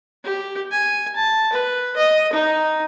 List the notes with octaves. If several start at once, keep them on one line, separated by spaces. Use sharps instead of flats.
G4
G#5
A5
B4
D#5
D#4